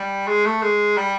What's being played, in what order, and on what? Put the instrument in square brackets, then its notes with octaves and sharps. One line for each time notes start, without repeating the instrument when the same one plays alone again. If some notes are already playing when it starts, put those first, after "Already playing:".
Already playing: [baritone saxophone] G3
G#3
A3
G#3
G3